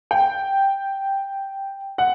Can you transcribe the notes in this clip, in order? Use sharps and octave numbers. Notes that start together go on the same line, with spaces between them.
G5
F#5